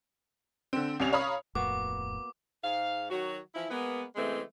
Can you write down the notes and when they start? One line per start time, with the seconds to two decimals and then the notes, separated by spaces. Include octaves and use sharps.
0.73 D3 C4
1.00 C2 C3 C#4 F7
1.13 C#5 F5 A#5 B5 D#6
1.55 D1 F2 A2 A#3 B3 F#4 D6
2.63 G#2 F5
3.10 D#3 F#3 F#4
3.55 E3 F3 E4
3.70 G#3 A#3 B3
4.16 C#3 E3 G#3 A3 C4